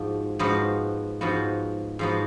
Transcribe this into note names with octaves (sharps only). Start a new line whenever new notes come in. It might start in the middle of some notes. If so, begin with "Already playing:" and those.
Already playing: G#2 F3 F#4
G#2 F3 B3 F#4
G#2 F3 B3 F#4
G#2 F3 B3 F#4